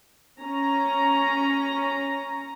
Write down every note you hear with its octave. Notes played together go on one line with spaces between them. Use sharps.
C#4 A#5